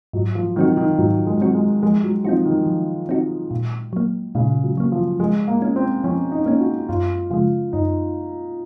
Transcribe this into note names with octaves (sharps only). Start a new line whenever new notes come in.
G#2 F#3
F3
D#3 F#3 C4 F#4
D#3
G#2 F#3
G#3
F#3 C4 F#4
G#3
F3 G#3
F#3
F3 C4 D#4 F#4
D#3
F3
C4 D#4 F#4
A#2
F#3 A#3
A#2 C#3
F#3
F#3 A#3
F3
F3 G#3
A#3
A#3 C#4
C4
F3 C#4
D#4
A#3 C#4
F#4
F#2 F4
C#3 F3 G#3 F4
F#2 D#4